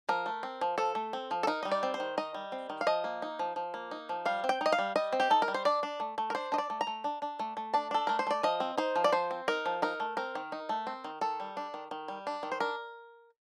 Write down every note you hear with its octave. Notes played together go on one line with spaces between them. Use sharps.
F3 A#4
A3
C4
F3
F3 A4
A3
C4
F3
A4
D#4 A#4
G3 D#5
D5
C4
C5
D#3
D#4 D#5
G3
C4
D#3
F5
F3 D#5
A#3
D#4
F3
F3
A#3
D#4
F3
G3 F5
C4
G5
D#4 D#5
F5
G3
G3 D#5
C4
G4
D#4 A4
A#4
G3
C5
D4 D5
D4
A3
A3
A#4
D4 C5
D4 D#5
D5
A3
A#5
A3
D4
D4
A3
A3
D4 A5
D4 A4
A3 A#4
C5
A3 D5
F3 D#5
C4
D#4 C5
F3
D5
F3 C5
C4
D#4 A#4
F3
D#4 A#4
A3
C4 A#4
D#3
D#4
A3
C4
D#3
D#3 A4
G3
D4
D#3
D#3
G3
D4
D#3
C5
D4 A#4